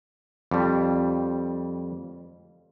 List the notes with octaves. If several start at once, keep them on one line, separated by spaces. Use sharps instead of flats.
F2 G3